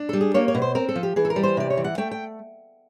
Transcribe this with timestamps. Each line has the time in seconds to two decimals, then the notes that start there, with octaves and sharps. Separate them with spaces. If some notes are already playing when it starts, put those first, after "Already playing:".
Already playing: D4
0.09 G3 A4
0.21 G#4
0.34 A#3 C#5
0.48 C#5
0.55 B2
0.62 C5
0.75 C4 A#4
0.89 A4
0.95 F3
1.03 G4
1.16 E3 G#4
1.25 A4
1.30 A#4
1.36 G3
1.43 C5
1.57 C3 D5
1.70 C#5
1.77 E3
1.84 F#5
1.98 A3 G5
2.11 G5